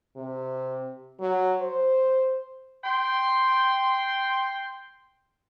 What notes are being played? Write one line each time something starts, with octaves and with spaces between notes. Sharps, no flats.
C3
F#3
C5
G5 C6